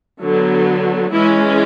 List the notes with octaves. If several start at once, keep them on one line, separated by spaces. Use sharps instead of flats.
D3 F#3 B3
E3 G#3 C#4 E4